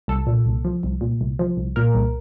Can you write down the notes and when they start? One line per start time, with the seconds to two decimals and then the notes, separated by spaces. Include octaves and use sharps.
0.08 C2 A4
0.27 A#2
0.45 C2
0.64 F3
0.83 C2
1.01 A#2
1.21 C2
1.39 F3
1.57 C2
1.76 A#2 A#4
1.94 C2